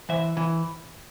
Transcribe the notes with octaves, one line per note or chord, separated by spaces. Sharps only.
E3 C5 E5
E3